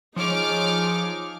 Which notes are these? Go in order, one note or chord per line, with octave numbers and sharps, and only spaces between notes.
F3 D#4 G#4 C#5 D6 F6